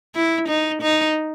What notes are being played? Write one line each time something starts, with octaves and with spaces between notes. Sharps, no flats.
E4
D#4
D#4